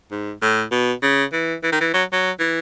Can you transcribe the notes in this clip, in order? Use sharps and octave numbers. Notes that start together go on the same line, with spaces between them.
G#2
A2
B2
C#3
E3
E3
D#3
E3
F#3
F#3
E3